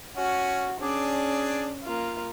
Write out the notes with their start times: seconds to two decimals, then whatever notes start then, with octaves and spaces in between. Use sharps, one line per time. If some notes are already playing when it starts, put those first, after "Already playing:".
0.16 C#4 F#4
0.80 C#4 D4 G#4 D5
1.84 A#3 F4